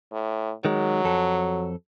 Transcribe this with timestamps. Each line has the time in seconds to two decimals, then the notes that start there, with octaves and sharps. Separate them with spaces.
0.12 A2
0.65 D#3 F#3 G#3
1.05 F2 A4